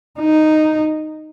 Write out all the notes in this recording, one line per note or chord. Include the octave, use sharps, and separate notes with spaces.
D#4